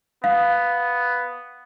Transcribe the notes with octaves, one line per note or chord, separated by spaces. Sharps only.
B3 F5